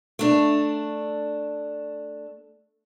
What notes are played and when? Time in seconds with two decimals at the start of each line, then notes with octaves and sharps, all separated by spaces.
0.19 A3 D4